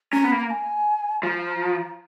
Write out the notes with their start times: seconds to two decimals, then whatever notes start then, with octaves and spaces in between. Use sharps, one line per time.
0.13 C#4 A#5
0.24 B3
0.30 A#3 B5
0.39 A#5
0.50 G#5
1.23 F3 A#5